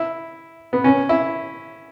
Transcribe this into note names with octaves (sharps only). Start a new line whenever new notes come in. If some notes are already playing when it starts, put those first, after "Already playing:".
Already playing: E4
B3
C#4
E4